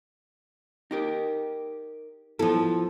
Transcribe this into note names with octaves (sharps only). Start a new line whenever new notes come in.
D#4 G4 A#4
F3 B3 E4 A4